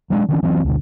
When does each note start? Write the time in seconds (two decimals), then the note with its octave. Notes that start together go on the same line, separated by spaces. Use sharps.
0.10 F#3 G#3 A#3 D4
0.29 D3 E3 C#4
0.43 E3 F#3 C4
0.65 D2 B2 D3